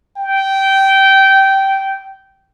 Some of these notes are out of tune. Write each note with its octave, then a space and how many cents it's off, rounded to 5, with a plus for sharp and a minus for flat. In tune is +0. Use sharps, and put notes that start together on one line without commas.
G5 -15